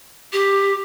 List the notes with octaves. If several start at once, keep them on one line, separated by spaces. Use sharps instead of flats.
G4